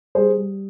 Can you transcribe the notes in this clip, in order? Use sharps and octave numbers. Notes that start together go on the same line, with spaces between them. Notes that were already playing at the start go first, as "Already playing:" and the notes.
G3 G#4 C5
G3